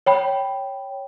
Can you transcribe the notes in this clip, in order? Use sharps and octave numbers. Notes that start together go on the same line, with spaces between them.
C#5 G5 B5